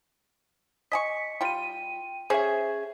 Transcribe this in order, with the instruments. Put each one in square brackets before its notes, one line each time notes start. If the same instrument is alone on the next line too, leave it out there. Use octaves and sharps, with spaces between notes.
[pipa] D#5 G#5 C#6 [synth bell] B6 C#7
[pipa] G3 F4 [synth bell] G5 D#7
[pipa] C#4 C#5 [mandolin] G#4 [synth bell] C5 E5